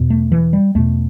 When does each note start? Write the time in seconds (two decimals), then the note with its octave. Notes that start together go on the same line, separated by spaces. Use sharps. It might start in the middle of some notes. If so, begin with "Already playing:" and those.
Already playing: E2 B2
0.10 A3
0.32 E3
0.53 G3
0.75 E2 B2 A3